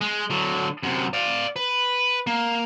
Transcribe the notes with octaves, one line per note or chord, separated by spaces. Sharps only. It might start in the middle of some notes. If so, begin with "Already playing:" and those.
G#3
D3 F#3
F#2 C3
D5 F5
B4
A#3